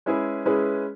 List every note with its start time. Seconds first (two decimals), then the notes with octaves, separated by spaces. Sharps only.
0.06 G#3 C#4 E4 G#4 B4
0.45 G#3 C#4 E4 G#4 B4